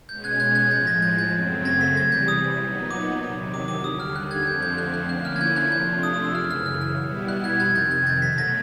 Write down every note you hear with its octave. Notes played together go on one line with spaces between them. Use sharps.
B2 G#3 C#4 G6
F#6 G#6
F#6 G#6
F#6 G#6
A2 F3 G#3 G6 A6
G#6 A#6
G6 A6
G6 A6
F#2 C#3 F#3 A3 C4
G#6 A#6
A6 B6
E2 C3 E3 G3 G#6 A#6
G6 A6
D#6
A#2 F#3 B3 D#4
D6
E2 C3 D#3 F#3
D6
D6
D#2 D3 G3 D#6
F6
F#6
F#6 G#6
F2 D3 F3 A3 C4 G6
G6
F#6
F#6
D3 F3 A#3 C#4 E4 F#6
F6
G#6
G6
F#6 G#6
C3 F3 A3 D4 F4 G6
D#6
D#6
E6
F#2 C#3 E3 F6
F6
F6
F6
B2 G3 B3 E4
F#6
F#6 G#6
F2 C3 D#3 F#6 G#6
G6 A6
F#6 G#6
G6 A6
B2 F#3 A3 A6 B6
G#6 A#6